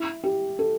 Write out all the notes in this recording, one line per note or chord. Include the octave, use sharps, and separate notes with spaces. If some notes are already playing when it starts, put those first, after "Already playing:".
Already playing: E4
G4
A4